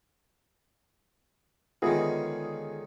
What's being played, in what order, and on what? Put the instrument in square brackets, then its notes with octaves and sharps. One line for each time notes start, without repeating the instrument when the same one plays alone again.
[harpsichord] C#2 D3 D#3 [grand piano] B3 G#4 [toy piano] F4 E5 F#5